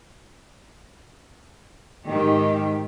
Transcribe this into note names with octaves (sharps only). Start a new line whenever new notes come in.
G#2 D#3 G4